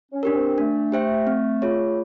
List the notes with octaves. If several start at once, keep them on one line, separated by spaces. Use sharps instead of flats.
C#4
D4 G4 A#4
C4
A3 D4
G4 C5 E5 G5
C4
F4 G#4 C#5